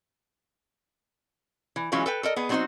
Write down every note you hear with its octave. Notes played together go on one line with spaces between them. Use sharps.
E3
E3 F#3 G#3 C#4 F4 C#5
A4 B4 G5
A4 A#4 D#5
B3 G#4
F#3 G3 C4 D#4 F#4 C5